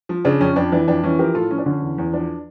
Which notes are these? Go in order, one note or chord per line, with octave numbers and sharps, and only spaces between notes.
F3
C#3 D4
F2 C#4
F2 D4
E3 D4
F2 D4
E3 C#4
F3 G4 A#4
A2 F4 A4
F3 C#4
D4
D3 C#4
E2
E2
F3 D4